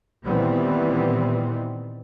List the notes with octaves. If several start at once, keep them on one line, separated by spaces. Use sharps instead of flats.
A#2 D#3 E3 G3 B3 C4